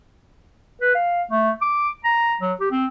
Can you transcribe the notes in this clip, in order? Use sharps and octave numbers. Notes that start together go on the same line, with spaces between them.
B4
F5
A3
D6
A#5
F#3
G4
C4